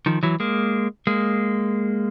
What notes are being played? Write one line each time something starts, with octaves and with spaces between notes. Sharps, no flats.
D#3 F3
E3 F#3
G#3 A#3
G#3 A#3